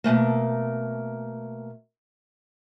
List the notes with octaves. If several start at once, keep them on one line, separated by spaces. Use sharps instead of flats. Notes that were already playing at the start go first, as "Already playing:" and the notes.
B2 F3 A3 A#3